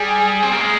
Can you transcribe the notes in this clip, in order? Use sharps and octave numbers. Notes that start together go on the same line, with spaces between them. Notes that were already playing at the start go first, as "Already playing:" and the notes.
Already playing: G3 G#4
C4
A#3
G#3